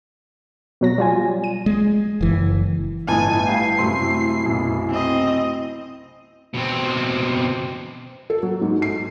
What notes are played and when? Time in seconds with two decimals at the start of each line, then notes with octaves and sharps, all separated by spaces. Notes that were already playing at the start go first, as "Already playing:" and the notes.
0.81 B2 F#3 A#6
0.98 G3 F4 G#5
1.44 D#7
1.66 G#3
2.21 F#1 E3
3.08 G1 A2 E4 D#5 G#5 A5
3.49 G2 F5 G5 C7
3.78 F#2 C3 A3 C6
4.46 B1 F#2
4.89 C4 D#5
6.54 B2 C4
8.30 A4
8.43 F#3
8.62 G#2
8.82 C7